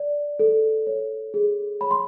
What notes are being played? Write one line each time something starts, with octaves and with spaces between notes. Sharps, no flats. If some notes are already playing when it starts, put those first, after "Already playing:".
Already playing: D5
A4
C#5
G#4
C#5 B5
C6